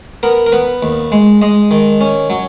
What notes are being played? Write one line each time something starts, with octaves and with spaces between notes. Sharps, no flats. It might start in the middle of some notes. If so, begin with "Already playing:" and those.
B3 A#4
A#4
B3 B4
D#2
G#3
G#3 D#5
D#3
C#4
F#3